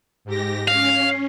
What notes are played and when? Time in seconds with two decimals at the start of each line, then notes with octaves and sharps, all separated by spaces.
0.25 G#2 G4 A#6
0.68 C#4 F5